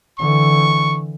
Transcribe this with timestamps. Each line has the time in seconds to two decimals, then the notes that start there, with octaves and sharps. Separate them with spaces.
0.19 D3 E3 C#6